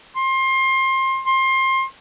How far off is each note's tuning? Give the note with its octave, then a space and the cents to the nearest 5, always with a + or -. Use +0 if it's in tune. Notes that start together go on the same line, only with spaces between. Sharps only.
C6 +25
C6 +25